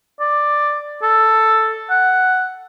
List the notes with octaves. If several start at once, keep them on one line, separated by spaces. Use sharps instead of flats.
D5
A4
F#5